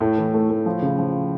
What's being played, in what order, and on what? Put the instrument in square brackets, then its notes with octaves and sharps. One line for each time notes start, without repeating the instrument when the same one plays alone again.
[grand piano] A2 [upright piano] A3
[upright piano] E3
A3
A3
F3
C#3
F3